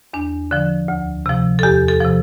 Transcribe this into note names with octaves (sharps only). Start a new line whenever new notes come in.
E2 D4
D3 F3
D2
C3 F3
A4
E2 G4
A4
C3 F3